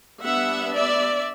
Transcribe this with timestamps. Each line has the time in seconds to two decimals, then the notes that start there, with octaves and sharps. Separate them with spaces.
0.22 G3 B3 D4 E5 F#5
0.73 D5 E5